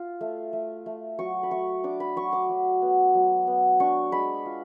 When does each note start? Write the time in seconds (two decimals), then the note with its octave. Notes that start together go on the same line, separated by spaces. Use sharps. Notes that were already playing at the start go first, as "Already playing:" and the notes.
Already playing: F4
0.21 A3
0.53 A3
0.86 A3
1.19 F#3 C#6
1.43 B5
1.51 A3 C#6
1.84 D4 D6
2.00 B5
2.16 F#3 C#6
2.33 D6
2.49 F#3
2.82 B3
3.14 F#3
3.47 B3
3.80 D4 C#6
4.12 G#3 B5
4.46 F4